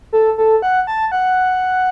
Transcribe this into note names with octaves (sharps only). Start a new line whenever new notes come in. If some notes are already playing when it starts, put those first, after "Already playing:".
A4
A4
F#5
A5
F#5